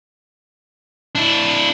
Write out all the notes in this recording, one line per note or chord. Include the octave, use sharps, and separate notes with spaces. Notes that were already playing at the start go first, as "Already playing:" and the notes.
D4 E4